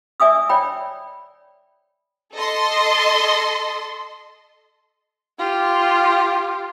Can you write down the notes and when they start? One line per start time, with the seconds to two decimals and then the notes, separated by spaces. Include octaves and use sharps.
0.20 D5 E5 G#5 D#6 E6
0.49 C#5 D5 G5 B5
2.34 A4 D#5 C6
5.39 F4 G4